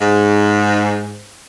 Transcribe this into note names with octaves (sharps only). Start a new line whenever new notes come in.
G#2